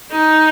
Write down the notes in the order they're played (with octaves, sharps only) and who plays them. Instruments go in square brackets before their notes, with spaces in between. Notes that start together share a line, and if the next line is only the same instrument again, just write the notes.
[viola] D#4